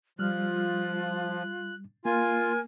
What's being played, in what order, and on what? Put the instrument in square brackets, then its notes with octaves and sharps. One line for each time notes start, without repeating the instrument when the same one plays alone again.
[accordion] F3 [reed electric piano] G3 F6 [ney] F4 [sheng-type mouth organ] F#6
[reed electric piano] A#3 [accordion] F4 [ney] A#4 [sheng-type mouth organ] G#5